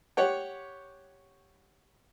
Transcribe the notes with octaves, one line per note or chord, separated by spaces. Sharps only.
G4 C#5 F#5